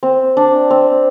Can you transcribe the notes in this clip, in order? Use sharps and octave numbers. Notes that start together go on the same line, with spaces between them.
C4
D4
C4